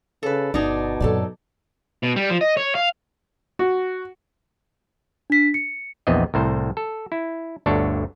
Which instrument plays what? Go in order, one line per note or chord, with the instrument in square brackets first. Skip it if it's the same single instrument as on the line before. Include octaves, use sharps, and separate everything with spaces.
[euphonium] C#3 [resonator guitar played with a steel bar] A4 B4
[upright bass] G1 [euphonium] B2 [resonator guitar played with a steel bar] D4 D#4 G#4 [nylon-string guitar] D5
[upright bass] F#2 A#2 [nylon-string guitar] A4 C#5 D5
[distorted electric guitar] B2
G3
F3
D#5
C#5
F5
[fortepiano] F#4
[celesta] D4 B6
C#7
[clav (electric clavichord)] A#1 E2 B3 C4 D#5
C2 A2 C5
A4
E4
G1 D2 D4 A4 C#5